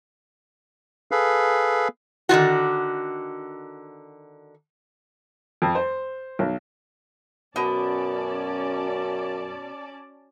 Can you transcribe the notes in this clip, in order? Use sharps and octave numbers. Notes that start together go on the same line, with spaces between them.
G#4 A4 B4 F5
D3 D#3 F4 F#4
F2
C5
B1
F#2 B2 C#4 D5 A5